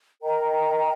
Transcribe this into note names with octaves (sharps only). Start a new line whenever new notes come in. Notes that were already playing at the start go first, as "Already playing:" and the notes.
A#4 D#5 G5 A#5